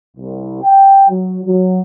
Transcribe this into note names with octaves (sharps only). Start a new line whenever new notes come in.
C2
G5
F#3
F#3